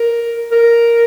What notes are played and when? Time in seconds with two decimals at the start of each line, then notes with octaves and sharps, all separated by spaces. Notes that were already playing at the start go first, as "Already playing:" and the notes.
Already playing: A#4
0.52 A#4